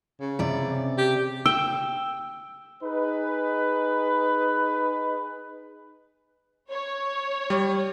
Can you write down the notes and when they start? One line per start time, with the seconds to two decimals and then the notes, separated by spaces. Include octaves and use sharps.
0.21 C#3
0.39 C3 D5
0.98 G4
1.46 G5 E6
2.83 D#4 G#4 B4
6.70 C#5
7.50 G3